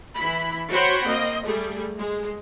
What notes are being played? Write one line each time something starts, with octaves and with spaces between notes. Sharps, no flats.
E3 E4 B5
F#4 C5 C#5 F#5 G5 B5
A#3 C4 D#5
G3 A3 G#4
G#3